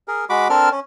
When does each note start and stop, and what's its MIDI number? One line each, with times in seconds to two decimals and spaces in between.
0.08 0.25 68
0.08 0.25 70
0.30 0.48 56
0.30 0.48 66
0.30 0.48 83
0.30 0.48 86
0.50 0.69 60
0.50 0.69 62
0.50 0.69 69
0.50 0.69 70
0.50 0.69 89
0.71 0.80 61